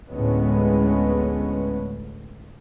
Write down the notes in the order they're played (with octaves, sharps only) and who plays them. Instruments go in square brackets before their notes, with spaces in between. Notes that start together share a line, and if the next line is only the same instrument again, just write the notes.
[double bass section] D2 A2 G#3 B3 C#4